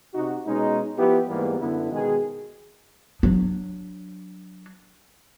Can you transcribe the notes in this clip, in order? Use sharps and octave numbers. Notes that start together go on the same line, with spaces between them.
C3 D#4 F#4
B2 G#3 C#4 D#4
F3 B3 E4 G4
G#2 E3 G3 A#3 B3
F#2 D3 B3 E4
B2 D#3 G#3 G#4
F#3 D4